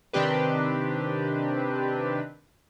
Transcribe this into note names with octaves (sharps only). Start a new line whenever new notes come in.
C3 D#3 C4 D4 G4 B4